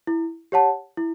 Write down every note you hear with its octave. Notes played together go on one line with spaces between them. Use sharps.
E4
G4 C#5 F#5 A5
E4